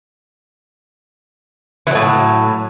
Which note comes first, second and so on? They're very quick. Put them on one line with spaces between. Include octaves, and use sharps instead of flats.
E3 F#3 A2